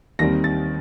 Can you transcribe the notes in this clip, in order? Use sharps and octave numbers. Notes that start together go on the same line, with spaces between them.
D#2 D#3 G3 C4 A#6
A6